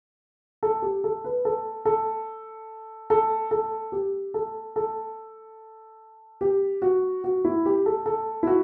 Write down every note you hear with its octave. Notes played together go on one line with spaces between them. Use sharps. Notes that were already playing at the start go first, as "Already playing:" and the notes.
A4
G4
A4
B4
A4
A4
A4
A4
G4
A4
A4
G4
F#4
F#4
E4
G4
A4
A4
E4
F#4